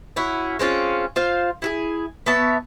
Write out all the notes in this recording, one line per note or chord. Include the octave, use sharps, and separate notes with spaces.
C#4 E4 F#4
G#3 C4 C#4 F4
F4 C5 F5
E4 F#4 G#4
B3 C#5 E5 A5